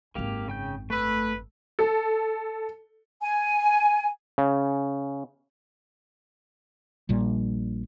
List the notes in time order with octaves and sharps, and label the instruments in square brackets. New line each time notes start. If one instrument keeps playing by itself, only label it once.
[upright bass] G#1 F#2 [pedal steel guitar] A#3 G4 F5
[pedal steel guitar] C#3 G5 G6
[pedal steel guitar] A3 E6 [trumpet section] B4
[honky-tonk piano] A4
[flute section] G#5
[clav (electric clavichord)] C#3
[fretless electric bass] A#1 A#2 G3